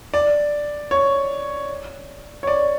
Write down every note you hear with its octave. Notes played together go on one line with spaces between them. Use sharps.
D5
C#5
C#5
D5